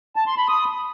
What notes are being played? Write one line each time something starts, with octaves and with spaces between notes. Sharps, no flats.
A5
C6
B5
D#6